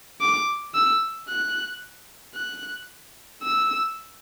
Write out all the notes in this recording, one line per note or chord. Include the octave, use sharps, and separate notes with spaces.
D6
E6
F#6
F#6
E6